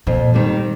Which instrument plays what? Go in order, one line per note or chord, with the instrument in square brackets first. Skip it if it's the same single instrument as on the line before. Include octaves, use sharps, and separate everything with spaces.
[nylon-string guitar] F2 [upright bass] A#2
[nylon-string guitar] D#3 G3 C4